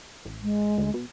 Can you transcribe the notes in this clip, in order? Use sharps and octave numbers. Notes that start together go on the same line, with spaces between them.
A1
G#3
D2
B2